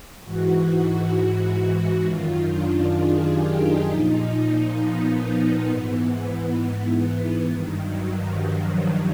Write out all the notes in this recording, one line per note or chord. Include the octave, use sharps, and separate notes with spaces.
G#2 E3 F#4
F#2 D#3 F4
D4
G#4
G4
D#4
A#2 F3
B3
G#2 E3
G2 D#3
F#3
F3
F#3